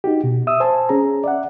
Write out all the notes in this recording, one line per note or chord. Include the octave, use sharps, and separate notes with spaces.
D#4 F#4 G4
B2
E5 D#6 E6
C5 G#5 A5 C6
C#4 G#4 A#5
D5 E5 F#5